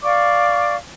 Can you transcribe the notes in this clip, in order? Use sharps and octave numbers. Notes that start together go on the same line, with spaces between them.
D5 F5 C#6 D6